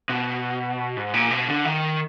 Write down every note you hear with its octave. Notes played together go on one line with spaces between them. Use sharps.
B2
G#2
A#2
B2
D3
D#3